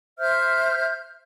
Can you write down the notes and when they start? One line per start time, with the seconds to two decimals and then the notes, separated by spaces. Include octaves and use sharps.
0.19 C5 E5 F6 G6